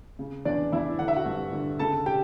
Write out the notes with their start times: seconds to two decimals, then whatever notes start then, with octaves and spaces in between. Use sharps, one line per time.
0.19 C#3
0.45 E2 D4 D5
0.72 E2 E4 E5
0.99 D3 F#5
1.08 E5
1.16 F#4 F#5
1.26 G2
1.53 D3
1.79 C#3 A4 A5
2.06 G4 G5